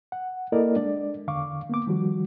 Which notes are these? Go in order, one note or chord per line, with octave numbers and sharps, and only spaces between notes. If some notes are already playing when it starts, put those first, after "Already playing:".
F#5
A#3 E4 A4 A#4 D5 D#5
G#3 D4 D5
E2 D3 F5 C#6 D6
A#3 B3 D6
D#3 F3 G3 F#4